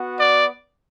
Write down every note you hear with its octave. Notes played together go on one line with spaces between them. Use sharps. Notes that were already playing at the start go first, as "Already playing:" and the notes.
Already playing: B3 F#4
D5